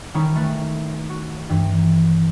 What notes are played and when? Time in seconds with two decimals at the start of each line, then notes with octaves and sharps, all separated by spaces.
0.14 D#3 G3 C#4 D#4 E4 C#5
0.35 A3 A#4 B4
1.10 F#4
1.49 G2 E3